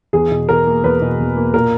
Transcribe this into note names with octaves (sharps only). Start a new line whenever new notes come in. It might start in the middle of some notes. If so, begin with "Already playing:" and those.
E2 G#4
B2
E2 A#4
A#3
E2 B4
B2
E2
A#3
A#2 A#4